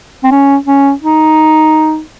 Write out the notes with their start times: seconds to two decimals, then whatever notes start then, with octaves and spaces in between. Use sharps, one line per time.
0.24 C4
0.31 C#4
0.67 C#4
1.02 D#4